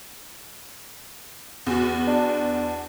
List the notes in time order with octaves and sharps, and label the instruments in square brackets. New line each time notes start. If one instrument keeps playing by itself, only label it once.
[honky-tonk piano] E2 F#4
[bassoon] D4